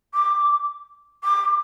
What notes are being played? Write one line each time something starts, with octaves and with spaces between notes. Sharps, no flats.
D6
D6